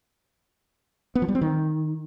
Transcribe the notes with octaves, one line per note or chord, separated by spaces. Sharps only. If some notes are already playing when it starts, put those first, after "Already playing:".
B3
F3
G3
C4
D#3